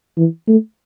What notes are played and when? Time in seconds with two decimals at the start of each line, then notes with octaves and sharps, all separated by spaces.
0.18 E3
0.48 A3